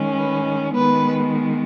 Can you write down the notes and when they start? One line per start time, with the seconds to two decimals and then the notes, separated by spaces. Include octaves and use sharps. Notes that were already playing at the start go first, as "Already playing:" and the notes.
Already playing: D#3 G#3 C#4
0.18 B4
0.75 D#3 G#3 B3 B4